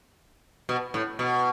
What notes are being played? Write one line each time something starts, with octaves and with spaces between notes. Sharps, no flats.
B2
A2
B2